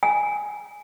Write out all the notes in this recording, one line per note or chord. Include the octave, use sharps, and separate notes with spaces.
G#5